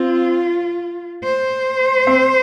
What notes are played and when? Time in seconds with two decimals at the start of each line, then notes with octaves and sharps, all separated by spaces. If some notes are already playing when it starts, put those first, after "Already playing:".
Already playing: C4 F4
1.24 C5
2.07 C4